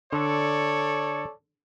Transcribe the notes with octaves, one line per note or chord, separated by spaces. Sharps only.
D3 A4 C#5 D5